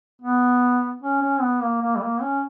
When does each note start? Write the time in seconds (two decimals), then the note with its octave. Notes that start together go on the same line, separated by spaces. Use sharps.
0.21 B3
1.02 C#4
1.22 C#4
1.42 B3
1.62 A#3
1.82 A#3
1.97 G3
2.03 A#3
2.22 C#4